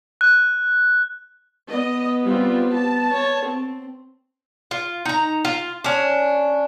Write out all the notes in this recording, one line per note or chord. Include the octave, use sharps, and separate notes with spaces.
F#6
B3 D#5
G3 C4 F4
A5
C#5
C4
F4
D#4 A#5
F4
C#4 D4